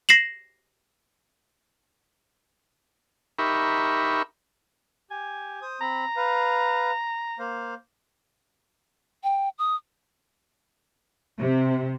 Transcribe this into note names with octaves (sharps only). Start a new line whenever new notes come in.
A#6 C7 E7 F#7
D#4 G4 A#4 E5 B5 C#6
G4 G#5
C5 D#6
C4 A#5 B5
B4 F5
A#3 C5 F5
G5
D#6
C3